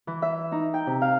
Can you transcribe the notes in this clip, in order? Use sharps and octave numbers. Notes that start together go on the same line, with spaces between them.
E3
E5
D#4
G5
C3
F5